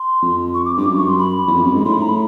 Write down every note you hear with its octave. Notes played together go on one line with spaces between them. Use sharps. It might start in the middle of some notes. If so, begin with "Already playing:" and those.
Already playing: C6
F2
C#6
D6
G2 D6
F#2
C#6
C6
B5
E2
F2
F#2
G#2
A2 C6
B5
A#5
B5